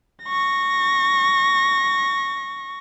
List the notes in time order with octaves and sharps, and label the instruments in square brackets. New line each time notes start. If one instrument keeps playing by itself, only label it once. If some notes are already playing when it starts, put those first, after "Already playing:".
[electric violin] C#6 A#6